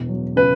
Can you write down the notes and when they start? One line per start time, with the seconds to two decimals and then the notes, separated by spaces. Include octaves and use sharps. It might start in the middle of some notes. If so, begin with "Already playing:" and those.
Already playing: E1 E2
0.09 F#3
0.36 C#3 B4